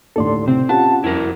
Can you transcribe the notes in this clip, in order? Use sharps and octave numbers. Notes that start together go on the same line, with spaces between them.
D#2 A2 D3 A4 D5 C6
C3 C4
C#4 F4 G4 F#5 A5
F2 E4 F#4 A#4